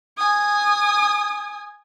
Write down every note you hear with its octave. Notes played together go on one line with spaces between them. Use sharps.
G#5 D#6